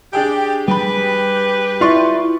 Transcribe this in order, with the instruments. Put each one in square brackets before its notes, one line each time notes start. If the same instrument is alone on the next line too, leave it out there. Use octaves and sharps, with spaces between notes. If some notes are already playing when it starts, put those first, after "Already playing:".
[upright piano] D4 G#4 G5 [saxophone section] G4
[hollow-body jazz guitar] G3 B5 [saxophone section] G4 B4
[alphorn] E4 [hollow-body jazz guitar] F4 [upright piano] D5 C6 C#6